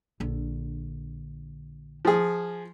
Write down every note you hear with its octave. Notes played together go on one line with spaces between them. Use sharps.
A#1 D3
F3 G#4